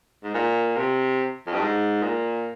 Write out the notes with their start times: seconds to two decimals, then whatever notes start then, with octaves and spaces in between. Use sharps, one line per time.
0.24 G#2
0.34 A#2
0.77 C3
1.47 F2
1.53 G2
1.61 G#2
2.03 A#2